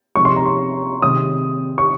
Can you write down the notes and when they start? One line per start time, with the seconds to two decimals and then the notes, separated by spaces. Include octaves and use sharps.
0.16 C3 F3 G#3 C#6
0.25 C6
0.36 A#5
0.46 C6
1.02 C3 D#3 G#3 D#6
1.78 C#6